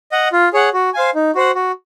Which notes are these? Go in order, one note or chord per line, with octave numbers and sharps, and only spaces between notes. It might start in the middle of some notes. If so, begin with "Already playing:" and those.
D#5 F#5
F4
G#4 C#5 F#5
F#4
C5 F5 G#5
D#4
F#4 C5 F#5
F#4